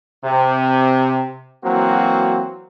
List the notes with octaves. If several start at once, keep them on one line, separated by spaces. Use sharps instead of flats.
C3
E3 F#3 A#3 C4 F#4